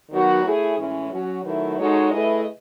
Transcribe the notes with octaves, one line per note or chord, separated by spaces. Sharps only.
D#3 F#3 B3 F#4
A3 E4 G#4 C#5
A2 E3 G#3 C#4
F#3 C#4 F#4
D#3 F#3 A3 E4 B4
G#3 D#4 F#4 A4 C#5
A3 E4 G#4 B4 D#5